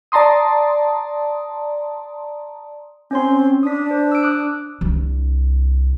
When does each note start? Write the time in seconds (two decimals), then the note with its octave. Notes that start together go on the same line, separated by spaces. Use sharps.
0.12 D5 A5 A#5 C6 D#6
3.11 C4 C#4 C#5 C6
3.63 D4 D#6 B6
3.91 C5
4.11 E6 D7
4.23 D6 D#6 F#6
4.81 C2 D4